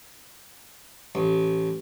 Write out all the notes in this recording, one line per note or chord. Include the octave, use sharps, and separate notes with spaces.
A1